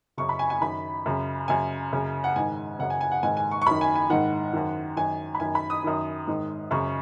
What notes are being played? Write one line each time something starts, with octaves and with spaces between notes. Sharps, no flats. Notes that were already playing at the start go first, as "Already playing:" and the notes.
F#2 C#3 C#6
B5
G#5
G#5
F#2 D#3 B5
F#2 C#3
F#2 C#3 G#5
F#2 C#3
F#5
G#2 D#3 G#5
F#2 C#3 F#5
G#5
G#5
F#5
G#2 D#3 G#5
G#5
C#6
C#6
F#2 D#3 B5
G#5
G#5
G#2 D#3 F#5
F#2 D#3
F#2 D#3 G#5
B5
F#2 D#3 G#5
B5
D#6
F#2 D#3
G#2 D#3
F#2 C#3 C#6